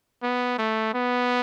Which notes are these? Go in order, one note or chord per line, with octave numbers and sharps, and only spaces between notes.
B3
A3
B3